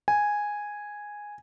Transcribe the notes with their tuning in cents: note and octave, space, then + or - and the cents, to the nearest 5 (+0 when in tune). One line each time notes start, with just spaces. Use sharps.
G#5 -5